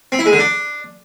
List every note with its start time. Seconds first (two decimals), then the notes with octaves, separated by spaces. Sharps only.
0.12 C4
0.19 E4
0.26 G#3
0.32 D3
0.39 D4